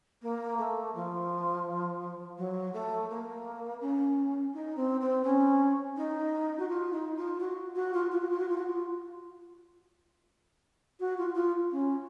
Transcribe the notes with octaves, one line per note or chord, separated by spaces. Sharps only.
A#3
A3
F3
F#3
A3
A#3
C#4
D#4
C4
C4
C#4
D#4
F#4
F4
D#4
F4
F#4
F#4
F4
F4
F#4
F4
F#4
F4
F#4
F4
F#4
F4
F4
C#4